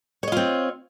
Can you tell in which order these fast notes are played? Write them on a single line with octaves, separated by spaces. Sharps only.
C#5 D#5 F4 C4